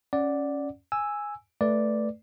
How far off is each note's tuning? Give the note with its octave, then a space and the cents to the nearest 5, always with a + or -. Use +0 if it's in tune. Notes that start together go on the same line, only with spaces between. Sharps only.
C#4 +0 D5 +0 F#5 +0
G#5 -5 E6 +0
A3 +0 B4 -10 D5 +0